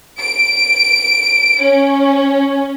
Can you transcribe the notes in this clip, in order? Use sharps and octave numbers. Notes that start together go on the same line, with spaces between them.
D7
C#4